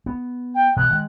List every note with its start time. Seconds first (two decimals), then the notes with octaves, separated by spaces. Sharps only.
0.06 B3
0.54 G5
0.76 B2 E3 F#6
0.91 D#3 G#3